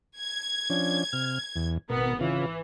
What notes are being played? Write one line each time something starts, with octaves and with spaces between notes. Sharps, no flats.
G#6
F3 C#4 D4
C3 F6
E2
G#1 B2 B3 A#4
C#3 E3 F4